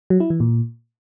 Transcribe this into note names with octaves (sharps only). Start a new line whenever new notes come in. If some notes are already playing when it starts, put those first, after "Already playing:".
F#3
E4
E3
A#2